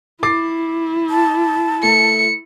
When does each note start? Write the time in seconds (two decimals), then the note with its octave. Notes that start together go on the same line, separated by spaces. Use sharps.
0.23 E4 D6 A6 C7
1.10 A5
1.83 A3 C#7